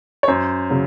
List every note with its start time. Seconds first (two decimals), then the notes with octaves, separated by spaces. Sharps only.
0.23 C#5
0.28 F#2 C5
0.70 C#3 F#3